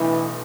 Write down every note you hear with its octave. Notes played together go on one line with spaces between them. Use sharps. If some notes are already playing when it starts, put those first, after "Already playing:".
Already playing: B1 A2 E3 D4